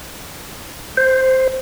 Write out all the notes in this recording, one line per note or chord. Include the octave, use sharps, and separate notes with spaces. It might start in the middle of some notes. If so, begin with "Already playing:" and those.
C5